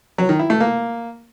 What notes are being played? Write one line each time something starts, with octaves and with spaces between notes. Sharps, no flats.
F#3
D#3
E4
A3
A#3